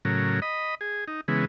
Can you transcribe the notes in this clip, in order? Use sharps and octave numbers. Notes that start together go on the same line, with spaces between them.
A2 C#3 F#3 A#4
D#5 B5
G#4
D#4
C#3 E3 G#3 B3